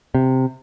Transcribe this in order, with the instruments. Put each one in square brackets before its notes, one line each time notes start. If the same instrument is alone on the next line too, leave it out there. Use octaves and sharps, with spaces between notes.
[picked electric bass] C3